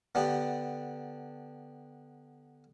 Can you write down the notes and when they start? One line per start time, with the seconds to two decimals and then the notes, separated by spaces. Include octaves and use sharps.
0.15 D3 B3 D4 G4